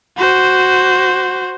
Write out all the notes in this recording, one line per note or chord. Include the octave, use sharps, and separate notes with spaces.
F#4 C5